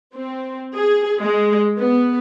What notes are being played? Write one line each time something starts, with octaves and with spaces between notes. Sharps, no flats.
C4
G#4
G#3
B3